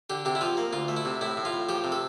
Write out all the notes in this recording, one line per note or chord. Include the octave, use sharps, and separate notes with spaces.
D3 G4
C3 G4
E4
F3 F4
A#3
D2 F4
A3
E4
C3
A2 E4
A2
F4
A2
F3 G4
C3
A4